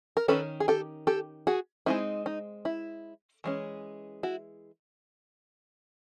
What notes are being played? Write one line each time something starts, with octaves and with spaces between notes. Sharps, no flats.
A#4
D#3 G#3 C#4 A4 B4
G#4
G4 A4
G4 A4
F#4 G#4
G#3 C4 D#4 E4
D#4
E4
E3 G#3 C#4
E4 F#4